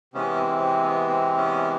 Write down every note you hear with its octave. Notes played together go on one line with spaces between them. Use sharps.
C3 E3 G#3 B3 C#4
C4
C4
B3
C4
B3 C#4